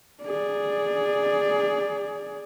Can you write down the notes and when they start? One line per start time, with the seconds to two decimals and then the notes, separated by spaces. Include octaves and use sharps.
0.23 G#4 D5